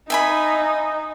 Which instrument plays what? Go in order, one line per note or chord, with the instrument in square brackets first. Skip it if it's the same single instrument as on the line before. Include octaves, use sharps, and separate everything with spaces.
[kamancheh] D#4 [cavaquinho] E5 G#5 B5